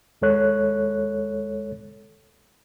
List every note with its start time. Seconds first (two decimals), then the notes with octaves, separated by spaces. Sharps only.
0.22 D#2 G#3 A4 C#5 F#6